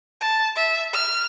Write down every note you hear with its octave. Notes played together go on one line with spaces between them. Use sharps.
A5
E5
F6